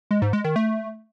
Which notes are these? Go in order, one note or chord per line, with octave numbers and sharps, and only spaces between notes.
G#3
G#2
G#3
D#3
A3